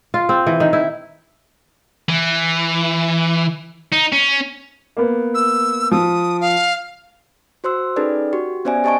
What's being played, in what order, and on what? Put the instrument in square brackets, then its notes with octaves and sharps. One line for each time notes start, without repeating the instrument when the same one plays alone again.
[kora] F4
C4
E3
D#3
E4
[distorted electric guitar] E3
D#4
C#4
[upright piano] A#3 B3
[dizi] E6
[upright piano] F3 [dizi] D#6
[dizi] F5
[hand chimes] F#4 C5 C6 E6
C#4 D#4 G#4 A4 B4 D5
F#4 G4
B3 C#4 C5 D5 E5 G#5
G4 D#5 G#5 A5 C#6 D7